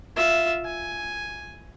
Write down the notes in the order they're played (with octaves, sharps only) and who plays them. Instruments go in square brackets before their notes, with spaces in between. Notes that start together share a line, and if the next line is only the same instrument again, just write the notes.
[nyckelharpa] F4 E5
G#5